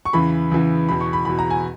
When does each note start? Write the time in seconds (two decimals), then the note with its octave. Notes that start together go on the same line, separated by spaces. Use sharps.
0.05 C#6
0.13 E2 C#3 E3 B5
0.51 E2 C#3 E3
0.88 E2 B2 B5
1.01 C#6
1.13 B5
1.25 E2 B2 B5
1.39 A#5
1.50 G#5